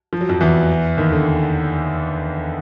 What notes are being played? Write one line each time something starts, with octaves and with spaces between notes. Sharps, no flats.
F3
F#3
F2 F3
E2 E3
D#2 D#3
D3